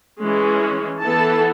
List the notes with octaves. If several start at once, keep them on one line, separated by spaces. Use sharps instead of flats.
E3 G#3 C#4
E3 B3 A4 A5